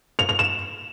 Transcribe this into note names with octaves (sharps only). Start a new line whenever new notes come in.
F7
F7
E7